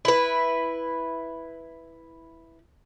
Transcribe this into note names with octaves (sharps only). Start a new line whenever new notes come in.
E4 B4